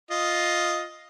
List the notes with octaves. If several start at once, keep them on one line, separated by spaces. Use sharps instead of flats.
F4 D#5